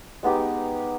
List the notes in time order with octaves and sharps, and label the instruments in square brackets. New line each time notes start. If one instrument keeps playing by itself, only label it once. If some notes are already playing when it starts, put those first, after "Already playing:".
[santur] G#3 B3 D#4 G4